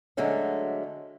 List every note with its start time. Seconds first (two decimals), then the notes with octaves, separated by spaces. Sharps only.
0.17 D3 F#3 G#3 A3 C#4